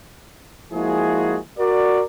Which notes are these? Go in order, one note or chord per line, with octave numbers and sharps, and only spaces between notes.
F3 G#3 A#3 E4 F#4 G#4
F#4 A#4 D5